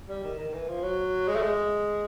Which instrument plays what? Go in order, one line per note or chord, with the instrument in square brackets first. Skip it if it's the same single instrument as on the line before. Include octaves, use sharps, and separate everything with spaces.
[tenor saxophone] G3
D#3
D#3
E3
F3
F#3
G#3
A3
G#3